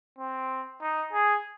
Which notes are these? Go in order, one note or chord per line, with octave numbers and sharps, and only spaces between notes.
C4
D#4
G#4